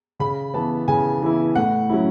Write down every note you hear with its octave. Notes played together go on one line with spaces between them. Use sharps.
C#3 B5
E3 B3 E4 A5
C#3 G#5
E3 B3 E4
A2 F#5
F#3 C#4 E4